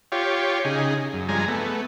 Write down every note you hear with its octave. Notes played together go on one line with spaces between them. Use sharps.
F4 G4 C#5
C#3 D#4 G#4
F#2
G2 F3 G#3 G#5 A#5
A3 B3